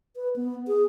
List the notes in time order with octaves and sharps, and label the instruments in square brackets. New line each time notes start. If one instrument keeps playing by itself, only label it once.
[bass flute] B4
B3
G#4